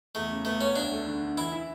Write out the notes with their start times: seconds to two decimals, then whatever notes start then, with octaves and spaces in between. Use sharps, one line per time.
0.15 E2 A3
0.30 C#3
0.45 A3 B3
0.61 B3 C#4
0.76 D2 D4
0.92 A3
1.06 D3
1.21 D3
1.37 E3 E4
1.52 E4